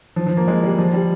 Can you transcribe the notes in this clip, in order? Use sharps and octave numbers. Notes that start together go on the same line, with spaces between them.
F3
F3
A#3
G#3
G3
F3
G3